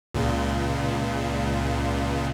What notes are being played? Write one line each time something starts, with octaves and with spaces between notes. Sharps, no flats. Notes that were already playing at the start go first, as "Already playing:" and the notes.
C#2 A#2 C#3